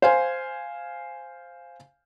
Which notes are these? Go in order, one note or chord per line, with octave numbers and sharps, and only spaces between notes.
C5 F5 G#5